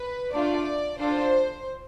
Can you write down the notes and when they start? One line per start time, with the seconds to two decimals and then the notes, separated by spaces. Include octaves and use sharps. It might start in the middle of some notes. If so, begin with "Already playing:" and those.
Already playing: B4
0.33 A3 D4 F4 D5
0.98 D4 F4 A4 C5